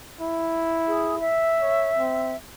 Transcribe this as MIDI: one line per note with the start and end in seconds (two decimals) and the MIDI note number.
0.21 1.30 64
0.88 1.15 68
1.20 2.35 76
1.62 1.91 73
1.97 2.35 60